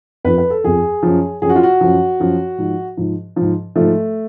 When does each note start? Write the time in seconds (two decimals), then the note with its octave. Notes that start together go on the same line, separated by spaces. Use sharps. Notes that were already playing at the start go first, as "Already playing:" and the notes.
0.24 F2 F3 B4
0.38 B4
0.50 A4
0.64 F2 F3 G#4
1.03 F#2 F3
1.42 F#2 F3 G#4
1.49 F#4
1.56 F4
1.63 F#4
1.81 F#2 F3
2.20 F#2 F3
2.58 G#2 F3
2.97 G#2 F3
3.36 F3
3.42 G#2
3.76 G#2 F3 A3